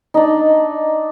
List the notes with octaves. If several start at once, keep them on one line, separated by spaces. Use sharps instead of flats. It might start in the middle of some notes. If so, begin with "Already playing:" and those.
D4 D#4